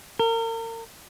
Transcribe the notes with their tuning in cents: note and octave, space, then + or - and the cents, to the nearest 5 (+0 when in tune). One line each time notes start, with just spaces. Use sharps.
A#4 -35